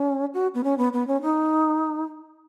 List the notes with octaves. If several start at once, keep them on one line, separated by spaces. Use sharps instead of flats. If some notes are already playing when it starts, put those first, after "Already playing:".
Already playing: C#4
F#4
B3
C#4
B3
B3
C#4
D#4